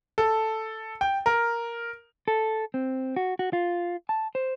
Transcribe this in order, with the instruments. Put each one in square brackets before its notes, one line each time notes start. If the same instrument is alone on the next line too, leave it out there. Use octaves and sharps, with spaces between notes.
[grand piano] A4
G5
A#4
[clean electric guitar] A4
C4
F#4
F#4
F4
A5
C5